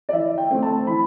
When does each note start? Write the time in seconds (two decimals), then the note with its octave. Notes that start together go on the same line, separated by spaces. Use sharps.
0.09 D5
0.13 E3 E5
0.38 G5
0.50 A3 C4
0.63 A5
0.87 E3 B5